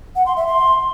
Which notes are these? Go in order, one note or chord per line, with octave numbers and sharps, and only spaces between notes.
F#5
C6
E5
C6